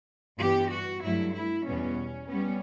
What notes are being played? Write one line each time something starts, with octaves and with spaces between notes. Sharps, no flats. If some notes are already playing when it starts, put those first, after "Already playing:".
G2 E3 B3 G4
F#4
G2 F#3 A3 E4
E4
E2 B2 G3 B3 C#4
G3 B3 C#4